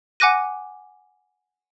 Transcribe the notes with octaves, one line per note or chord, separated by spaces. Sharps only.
F#5 G#5 D6 F#6 A#6 D#7